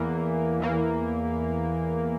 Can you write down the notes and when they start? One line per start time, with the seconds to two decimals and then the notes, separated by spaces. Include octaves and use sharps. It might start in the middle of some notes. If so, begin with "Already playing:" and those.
Already playing: E2 E3 A#3
0.60 E2 E3 A#3